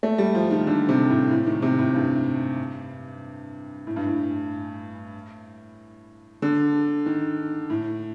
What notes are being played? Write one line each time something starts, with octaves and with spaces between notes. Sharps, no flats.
A3
G3
F3
D#3
D3
C3
A2
A2
D#3
C3
A2
G2
A2
G2
A2
D3
D#3
A2